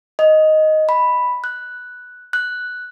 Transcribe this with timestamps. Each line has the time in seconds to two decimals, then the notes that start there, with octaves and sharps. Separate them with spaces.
0.19 D#5
0.89 B5
1.44 F#6
2.33 F#6